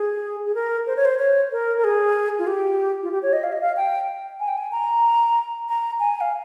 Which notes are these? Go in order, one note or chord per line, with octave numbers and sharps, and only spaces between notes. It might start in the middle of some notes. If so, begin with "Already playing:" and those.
Already playing: G#4
G#4
A#4
C5
C#5
C5
C#5
A#4
A#4
G#4
F4
G4
F4
G4
C#5
D#5
F5
D#5
F5
G5
G#5
G5
G#5
A#5
A#5
G#5
F5